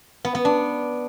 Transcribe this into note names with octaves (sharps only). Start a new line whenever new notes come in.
B3
B3
D4